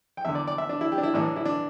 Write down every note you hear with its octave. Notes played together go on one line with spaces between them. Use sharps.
G5
E2 D3 E5
D5
D5
E5
D4
E4
G4
D4
E4
A1 A2 E3 D4
E4
D4